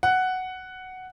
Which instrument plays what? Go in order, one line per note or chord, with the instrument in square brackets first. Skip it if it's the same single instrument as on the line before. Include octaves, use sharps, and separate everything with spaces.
[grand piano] F#5